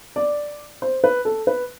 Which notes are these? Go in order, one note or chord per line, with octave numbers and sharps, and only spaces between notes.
D5
C5
B4
A4
B4